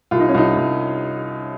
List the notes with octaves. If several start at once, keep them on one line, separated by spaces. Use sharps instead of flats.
C2 F4
D#4
C#4
C2 D#4
C2